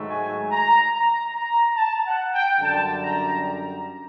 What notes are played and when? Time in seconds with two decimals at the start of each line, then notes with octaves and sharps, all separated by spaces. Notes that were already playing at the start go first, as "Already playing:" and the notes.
Already playing: G#2 D#3 F#3 A3
0.08 G#5
0.51 A#5
0.93 A#5
1.34 A#5
1.76 A5
2.05 F#5
2.33 G5
2.61 F#2 D3 G3 A5
3.03 A#5
3.45 A#5